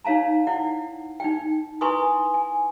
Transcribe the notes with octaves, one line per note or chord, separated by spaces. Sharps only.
D#4 C#5 F5 A5 A#5
E4 D5 F#5
D#4 D5 G5
E4 B4 G#5 C6 C#6 D#6
G#5